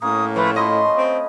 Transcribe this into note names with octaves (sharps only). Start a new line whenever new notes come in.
A2 A#3 C#4 D#6
F3 A3 B4 C#5 G#5
F3 A3 D#5 B5 C6
C4